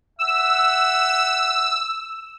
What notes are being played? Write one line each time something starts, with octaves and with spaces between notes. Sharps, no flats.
E5 F#5 E6